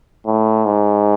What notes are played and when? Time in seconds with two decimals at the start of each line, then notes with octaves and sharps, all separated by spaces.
0.26 A2
0.65 G#2